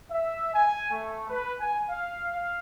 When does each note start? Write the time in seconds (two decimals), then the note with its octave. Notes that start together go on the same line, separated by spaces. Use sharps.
0.11 E5
0.53 G#5
0.90 A3
1.29 B4
1.59 G#5
1.89 F5
2.29 F5